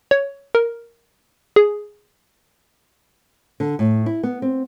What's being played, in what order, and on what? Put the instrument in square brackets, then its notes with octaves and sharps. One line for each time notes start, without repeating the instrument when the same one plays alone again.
[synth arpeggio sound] C#5
A#4
G#4
[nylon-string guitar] D3
A2
E4
B3
C4